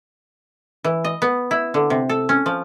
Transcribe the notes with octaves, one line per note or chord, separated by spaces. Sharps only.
E3
D#5
B3
E4
D3
C3
A4
C#4
F3